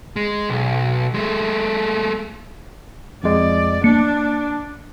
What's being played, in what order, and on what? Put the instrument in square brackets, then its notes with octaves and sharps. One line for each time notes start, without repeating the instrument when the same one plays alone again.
[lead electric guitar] G#3
B1
G#3 A3
[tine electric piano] F2 G#3 [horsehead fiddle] D5
[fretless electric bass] A#3 [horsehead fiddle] D4 [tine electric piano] C#7